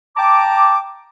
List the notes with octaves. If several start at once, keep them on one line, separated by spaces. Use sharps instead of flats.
G5 A5 A#5 D6